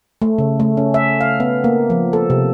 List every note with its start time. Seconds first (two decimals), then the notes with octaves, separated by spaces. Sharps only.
0.22 A3
0.38 C#3
0.60 A3
0.77 C#4
0.94 E5
1.21 F5
1.40 B3
1.64 A#3
1.90 F3
2.13 A4
2.30 C3